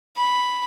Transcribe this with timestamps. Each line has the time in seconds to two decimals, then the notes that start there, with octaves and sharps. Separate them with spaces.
0.17 B5